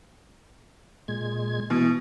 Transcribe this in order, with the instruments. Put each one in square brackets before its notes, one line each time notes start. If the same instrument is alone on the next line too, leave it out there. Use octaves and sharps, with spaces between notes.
[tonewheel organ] A#2 G#3 G#6
[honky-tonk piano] B2 [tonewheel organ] E3